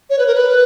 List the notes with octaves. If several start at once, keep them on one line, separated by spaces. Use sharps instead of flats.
C#5
B4
A#4
B4